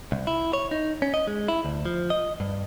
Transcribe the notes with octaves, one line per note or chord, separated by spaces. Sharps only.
C2
E4
C#5
D#4
C#4
D#5
G#3
E4
D2
F3
D#5
G2